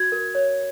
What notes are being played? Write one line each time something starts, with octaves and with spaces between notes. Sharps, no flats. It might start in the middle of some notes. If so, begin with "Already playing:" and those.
Already playing: F#4 G#6
A#4
C#5